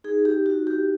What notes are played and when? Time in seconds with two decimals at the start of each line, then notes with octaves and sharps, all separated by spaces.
0.04 D#4 G#4
0.25 G4
0.46 F#4
0.67 G4